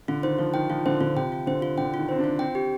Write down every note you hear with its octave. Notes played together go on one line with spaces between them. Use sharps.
D3 F4
D#3 C5
F3 F4
D#3 G5
F3 F4
D3 C5
D3 F4
C3 G5
F4
D3 C5
F4
D3 G5
D#3 F4
C4 C5
D4
F4
C4 G5
G4